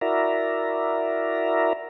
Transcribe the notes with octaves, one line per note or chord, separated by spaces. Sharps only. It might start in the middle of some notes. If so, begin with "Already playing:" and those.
E4 F#4 A#4 D5 E5 A#5